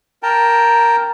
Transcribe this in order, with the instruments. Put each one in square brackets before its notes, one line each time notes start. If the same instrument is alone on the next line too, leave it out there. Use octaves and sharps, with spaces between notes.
[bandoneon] A#4 G5 A5 A#5